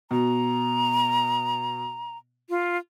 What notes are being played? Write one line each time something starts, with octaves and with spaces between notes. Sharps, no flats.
B2 A#5
F4